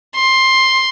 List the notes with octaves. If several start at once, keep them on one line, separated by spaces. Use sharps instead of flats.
C6